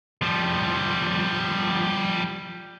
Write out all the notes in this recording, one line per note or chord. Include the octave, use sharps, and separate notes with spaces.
F3 G3